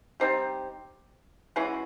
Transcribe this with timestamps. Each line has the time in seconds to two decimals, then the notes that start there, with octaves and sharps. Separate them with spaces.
0.20 G3 C4 D#4 G4
1.56 E3 G#3 C#4 F#4